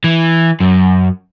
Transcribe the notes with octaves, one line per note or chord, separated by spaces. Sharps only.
E3
F#2